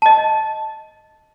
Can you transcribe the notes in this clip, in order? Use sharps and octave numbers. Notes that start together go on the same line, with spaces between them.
D#5 A5